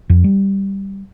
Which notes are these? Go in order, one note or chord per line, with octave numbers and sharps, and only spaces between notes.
F2
G3